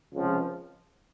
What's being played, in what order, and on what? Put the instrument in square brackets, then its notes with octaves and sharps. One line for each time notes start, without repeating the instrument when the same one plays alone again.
[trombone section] C#2 C3 F3